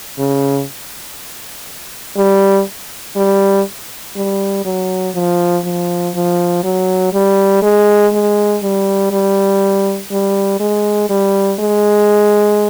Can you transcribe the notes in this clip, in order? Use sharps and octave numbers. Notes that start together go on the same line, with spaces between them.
C#3
G3
G3
G3
F#3
F3
F3
F3
F#3
G3
G#3
G#3
G3
G3
G3
G#3
G3
G#3